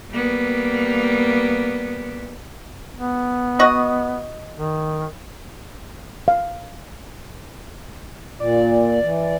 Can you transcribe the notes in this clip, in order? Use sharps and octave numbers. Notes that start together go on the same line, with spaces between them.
G3 A#3 B3
B3
F#4 D#5
D#3
F5
A#2 D5
E3